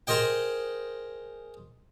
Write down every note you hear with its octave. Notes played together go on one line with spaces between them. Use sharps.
G#4 A#4 C5 D#5 G5